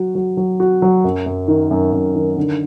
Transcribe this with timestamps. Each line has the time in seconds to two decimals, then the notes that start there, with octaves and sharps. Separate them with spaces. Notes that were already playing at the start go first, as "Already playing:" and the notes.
Already playing: F#3 F#4
0.15 F#3
0.37 F#3
0.60 F#4
0.82 F#3
1.04 F#2
1.26 F#2
1.48 D#3
1.71 F#2
1.93 F#2
2.15 D#3
2.37 D3